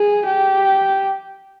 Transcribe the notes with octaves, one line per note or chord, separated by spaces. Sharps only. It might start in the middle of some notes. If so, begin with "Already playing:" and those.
Already playing: G#4
G4